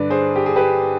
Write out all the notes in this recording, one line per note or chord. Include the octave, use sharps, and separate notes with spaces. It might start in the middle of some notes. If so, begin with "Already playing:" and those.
Already playing: G2 D3 B4 D5
G#4 C5
G4
G#4
G4 B4